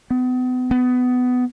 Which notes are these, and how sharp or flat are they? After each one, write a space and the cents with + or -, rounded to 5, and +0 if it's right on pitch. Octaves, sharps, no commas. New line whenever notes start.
B3 +35
B3 +20